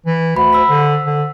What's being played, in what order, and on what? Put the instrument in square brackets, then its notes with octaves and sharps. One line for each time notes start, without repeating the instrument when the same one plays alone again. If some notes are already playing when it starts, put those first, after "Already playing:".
[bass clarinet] E3
[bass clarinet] D2 [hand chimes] F#5 B5
[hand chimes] C5 E6 B6
[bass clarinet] D3
D3